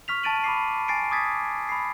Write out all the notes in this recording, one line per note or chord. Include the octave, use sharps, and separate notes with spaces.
C#6 F6 B6 F7
A5 C#6 A6 D7 D#7 F#7
B5 D6 C7
G#5 A6 C7 D7
D6 D#6 G#6 A6 B6
B5 C7